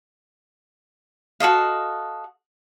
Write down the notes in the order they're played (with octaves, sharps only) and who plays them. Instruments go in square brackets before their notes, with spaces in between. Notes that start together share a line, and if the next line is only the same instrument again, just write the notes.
[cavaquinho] F#4 A4 D#5 F5